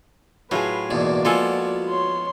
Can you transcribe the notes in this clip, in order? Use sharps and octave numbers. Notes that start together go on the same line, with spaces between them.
A2 F#3 F4 G#4 B4
E2 G#2 B2 A#3 F#4 D5
F3 G#3 B3 F4 A4 G#5
C#5 C6